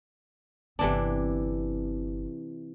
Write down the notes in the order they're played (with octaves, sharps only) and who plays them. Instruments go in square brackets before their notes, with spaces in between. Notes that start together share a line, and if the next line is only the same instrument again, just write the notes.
[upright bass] G1 C4 [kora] C3 E3 D4